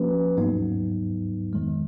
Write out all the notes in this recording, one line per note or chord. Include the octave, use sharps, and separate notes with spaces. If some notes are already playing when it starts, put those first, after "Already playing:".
Already playing: F3 A#3 C#4 F#4 B4
G#2 F#3 B3 D#4
F2 D#3 G#3